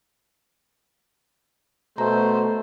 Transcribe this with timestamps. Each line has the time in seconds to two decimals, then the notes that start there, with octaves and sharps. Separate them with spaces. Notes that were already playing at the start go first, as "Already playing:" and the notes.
1.98 B2 A3 C5 A#5